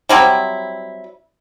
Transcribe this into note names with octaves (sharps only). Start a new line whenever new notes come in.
F#3 G3 C4 E4